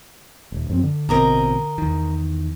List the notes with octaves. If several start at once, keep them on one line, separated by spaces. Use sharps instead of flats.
D#1
F#2 F3 C4
D3
A1 B2 C4 A#4 D#5 A#5
E2 D#3